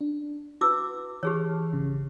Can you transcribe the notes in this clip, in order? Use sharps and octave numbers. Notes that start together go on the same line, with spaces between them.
D4
E4 F#4 B4 D6 E6
E3 G4 G#4 C#5 A5 F6
G#1 C#3